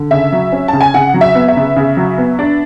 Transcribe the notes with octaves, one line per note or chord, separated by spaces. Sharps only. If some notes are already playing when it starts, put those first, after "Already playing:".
Already playing: D3
C#3 E5
F#3
C#4
C#3 A5
G#5
C#3 F#5
F#3
E5
B3
E5
C#3
C#3
F#3
B3
D4